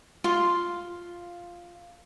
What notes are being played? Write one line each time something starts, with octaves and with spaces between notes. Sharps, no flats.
F4 C6